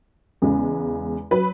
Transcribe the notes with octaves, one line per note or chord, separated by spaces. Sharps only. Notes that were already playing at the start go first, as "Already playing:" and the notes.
E2 C#3 G#3
F#3 B4